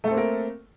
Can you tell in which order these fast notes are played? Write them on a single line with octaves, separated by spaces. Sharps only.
A3 A4 C4 A#3 A#4